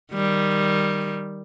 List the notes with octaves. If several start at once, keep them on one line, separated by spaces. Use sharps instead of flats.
D#3 G3